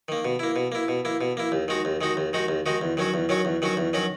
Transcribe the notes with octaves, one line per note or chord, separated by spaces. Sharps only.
D#3 A#3
B2
A#3 E4
B2
A#3 E4
B2
A#3 E4
B2
A#3 E4
D#2
D#3 G#3 D#4 F#4
D#2
D#3 G#3 D#4 F#4
D#2
D#3 G#3 D#4 F#4
D#2
D#3 G#3 D#4 F#4
E2
D#3 F#3 C#4 F#4
E2
D#3 F#3 C#4 F#4
E2
D#3 F#3 C#4 F#4
E2
D#3 F#3 C#4 F#4